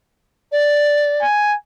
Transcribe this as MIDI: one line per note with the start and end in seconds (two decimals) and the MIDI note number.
0.52 1.24 74
1.22 1.55 80